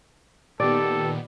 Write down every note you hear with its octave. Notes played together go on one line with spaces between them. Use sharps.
A#2 D#3 B3 G4 A4 D5